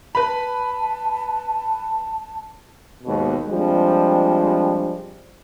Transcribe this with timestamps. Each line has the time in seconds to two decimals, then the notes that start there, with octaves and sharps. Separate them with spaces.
0.15 B4 A5 B5
3.04 D#2 G#2 B2
3.47 F3 G3 G#3 C4 D4